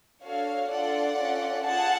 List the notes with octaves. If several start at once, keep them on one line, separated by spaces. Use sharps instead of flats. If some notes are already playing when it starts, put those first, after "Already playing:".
D4 F#4 A4 C#5 F5
D4 F4 A4 D5 F#5
C#4 F4 A4
F4 G#4 F#5 A5